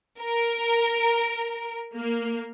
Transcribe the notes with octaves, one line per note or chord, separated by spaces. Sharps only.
A#4
A#3